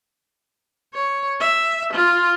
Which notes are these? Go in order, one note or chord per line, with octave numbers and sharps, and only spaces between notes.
C#5
E5
F4